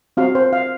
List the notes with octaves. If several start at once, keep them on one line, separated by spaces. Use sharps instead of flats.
C4 F#4 F5
C5
F5